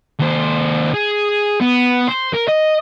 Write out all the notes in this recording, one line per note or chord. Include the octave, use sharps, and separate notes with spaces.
D#2 C5
G#4
B3
C5
A#4
D#5